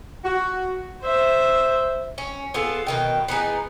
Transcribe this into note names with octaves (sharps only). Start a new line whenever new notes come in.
F#4
C5 E5
C#4
B3 F4 G#4 A4
B2 D#3 G5
E3 B3 D#4 G#4